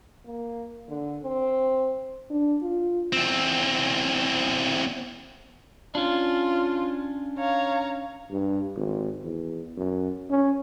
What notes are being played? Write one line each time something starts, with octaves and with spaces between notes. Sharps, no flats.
A#3
D3
C4
D4
F4
E2 C4
C#4 D4 F4
C#5 F5 A#5
G2
G#1
E2
F#2
C#4